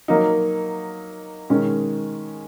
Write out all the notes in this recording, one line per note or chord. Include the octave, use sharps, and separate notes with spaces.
F#3 A#3 D#4
D#3 G#3 C#4